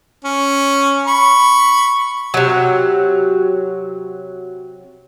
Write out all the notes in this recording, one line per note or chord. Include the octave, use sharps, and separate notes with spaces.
C#4
B5 C#6
C3 F#3